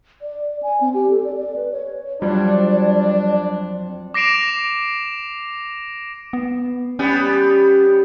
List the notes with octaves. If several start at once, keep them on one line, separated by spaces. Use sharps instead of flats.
D5
G#5
C4
G4
A4
D5
D5
B4
C#5
F2 F#3 G3 D4 D5
D6 A#6 C7 D7 E7 F7
B3
G3 B3 C#4